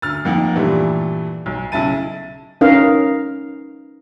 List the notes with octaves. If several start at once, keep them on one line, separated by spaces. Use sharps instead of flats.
D2 F6 A6
F2 A#3 D#4 F#5
G2 A#2 E3 G3 A3
B1
B1 C#3 E4 A5 A6 D#7
C#4 D#4 A#4 B4 F5